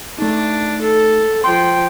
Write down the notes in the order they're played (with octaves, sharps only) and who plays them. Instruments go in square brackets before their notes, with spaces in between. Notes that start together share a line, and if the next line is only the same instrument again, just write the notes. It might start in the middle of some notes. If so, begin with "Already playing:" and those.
[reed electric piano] A3 D#4 [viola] D4
[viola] A4
[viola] F3 G5 [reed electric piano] C6